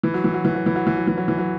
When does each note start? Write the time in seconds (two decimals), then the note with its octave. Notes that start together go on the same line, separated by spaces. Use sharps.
0.03 E3
0.14 F#3
0.24 E3
0.34 F#3
0.45 E3
0.55 F#3
0.66 E3
0.76 F#3
0.87 E3
0.97 F#3
1.07 E3
1.18 F#3
1.28 E3
1.38 F#3